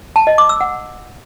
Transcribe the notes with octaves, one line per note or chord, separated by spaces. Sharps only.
A5
D#5
D6
E6
F#5